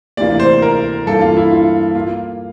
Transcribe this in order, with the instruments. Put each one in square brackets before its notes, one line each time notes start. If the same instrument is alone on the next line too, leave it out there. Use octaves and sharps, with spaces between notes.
[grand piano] D2 C3 E3 A#3 D5
C5
A#4
G2 E3 A#3 A4
F4
E4
F4
A#3 F4